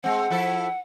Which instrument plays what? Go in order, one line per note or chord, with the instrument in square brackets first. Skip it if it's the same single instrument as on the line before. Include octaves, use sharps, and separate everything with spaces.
[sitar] G#3 C4 [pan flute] F#5
[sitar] F3 E4 A4